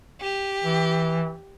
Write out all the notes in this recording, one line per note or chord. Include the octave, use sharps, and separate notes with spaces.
G4
E3